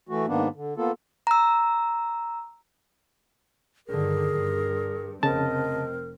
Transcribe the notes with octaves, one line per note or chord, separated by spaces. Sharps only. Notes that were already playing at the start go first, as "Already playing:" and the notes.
E3 A3 F#4
G#2 D#3 A#3 B3 D4
D3
A#3 B3 F4 A4
A#5 E6
G2 D3 D#3 G#4 A#4
G2
F1 C#3 C4 A#4 D#5 A5